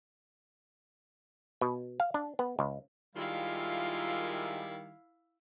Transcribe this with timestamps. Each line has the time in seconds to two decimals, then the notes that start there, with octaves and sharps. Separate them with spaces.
1.61 B2
2.00 F5
2.14 D4
2.39 B3
2.59 C#2
3.16 D#3 G3 G#3 E4 F4 A#4 E5 F5